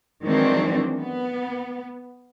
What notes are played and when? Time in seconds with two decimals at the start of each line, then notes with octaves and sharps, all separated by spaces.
0.24 D#3 E3 F#3 G#3 C4 D4
0.98 B3